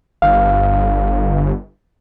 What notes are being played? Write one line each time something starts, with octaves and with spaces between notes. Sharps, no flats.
G1 F5